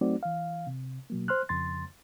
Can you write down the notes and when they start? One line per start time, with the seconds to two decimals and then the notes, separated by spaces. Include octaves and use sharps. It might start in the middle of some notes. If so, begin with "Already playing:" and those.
0.01 F#3 A3 C4 D#4 F#4 D5
0.23 E3 F5
0.67 C3
1.10 B2 F#3 A#3
1.28 C5 C6 F6 F#6
1.49 F2 C#3 C6 A6